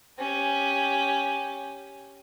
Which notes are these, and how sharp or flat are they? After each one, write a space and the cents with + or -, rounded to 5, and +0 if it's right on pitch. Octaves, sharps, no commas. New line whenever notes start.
C#4 +0 G4 +0